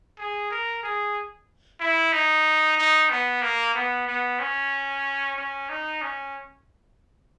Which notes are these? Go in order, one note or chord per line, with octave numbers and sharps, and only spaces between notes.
G#4
A#4
G#4
E4
D#4
D#4
B3
A#3
B3
B3
C#4
C#4
D#4
C#4